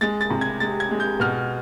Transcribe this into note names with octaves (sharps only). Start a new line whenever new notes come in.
G#3 A6
A6
C3
G#6
G#3 A6
G#6
G#3
G6
B2 F6